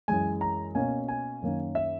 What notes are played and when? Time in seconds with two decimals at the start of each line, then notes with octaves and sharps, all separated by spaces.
0.08 F#2 E3 G#3 G#5
0.41 A#5
0.75 B2 A#3 C#4 G#5
1.08 G#5
1.42 F#2 D#3 A#3 C#4
1.75 E5